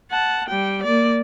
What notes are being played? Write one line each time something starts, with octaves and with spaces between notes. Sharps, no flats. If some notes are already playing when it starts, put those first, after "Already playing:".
F#5 A5
G3 G5
A#3 D5